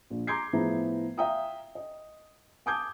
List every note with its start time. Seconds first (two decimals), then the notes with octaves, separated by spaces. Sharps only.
0.10 A#1
0.27 A#5 C6 D6 G6 G#6 C7
0.53 A2 F3 B3 E4 G#4 A#5
1.17 E5 F5 G5 A#5 D#6
1.75 D#5
2.66 G#5 A5 D6 D#6 G6 G#6